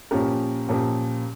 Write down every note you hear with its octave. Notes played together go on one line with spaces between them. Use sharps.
A#2 F3 C#4 G4 A#4
A#2 F3 C#4 G4 A#4